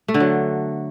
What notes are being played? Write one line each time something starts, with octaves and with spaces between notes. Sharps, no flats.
A3
D3
F#3